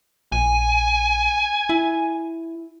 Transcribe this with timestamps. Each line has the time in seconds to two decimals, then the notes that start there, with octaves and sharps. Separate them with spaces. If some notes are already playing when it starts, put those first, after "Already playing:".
0.32 A#1 G#5
1.69 E4